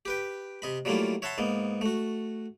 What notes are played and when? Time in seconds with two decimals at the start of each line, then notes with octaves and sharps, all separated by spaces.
0.05 G4 B4 G5
0.62 C3 D#5 B5
0.85 F#3 G3 A3 A#3 E4 F4
1.22 C#5 E5 F#5 A5 B5 C6
1.38 G#2 A#3 B3
1.81 A3 F#4